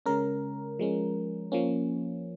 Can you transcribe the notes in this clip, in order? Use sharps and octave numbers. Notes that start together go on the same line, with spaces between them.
C#3 G#3 C#4 A#4
F3 G#3 C#4
F3 A#3 C#4